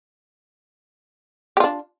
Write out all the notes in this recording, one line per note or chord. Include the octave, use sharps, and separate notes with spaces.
D4 F4 G4